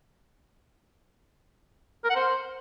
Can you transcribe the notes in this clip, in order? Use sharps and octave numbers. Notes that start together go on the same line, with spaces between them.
A#4
F#5
C5